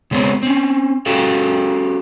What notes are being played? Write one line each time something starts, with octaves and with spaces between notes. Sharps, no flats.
C#3 G#3 B3 C4 C#5
C4 C#4
C#4 F#4 G4 A4 F5